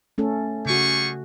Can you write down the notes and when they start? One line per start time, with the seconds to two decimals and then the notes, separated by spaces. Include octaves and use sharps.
0.18 A3 C#4 A4
0.66 C#3 G3 F#4 G#4 C#6